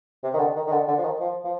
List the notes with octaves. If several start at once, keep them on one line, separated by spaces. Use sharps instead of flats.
C3
D#3
D3
D#3
D#3
D3
D3
F3
D#3
F3
F3